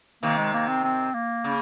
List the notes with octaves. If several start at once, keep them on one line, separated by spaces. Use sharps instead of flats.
C3 D#3 A#3
G#3
A#3
C4
C4
A#3
C#3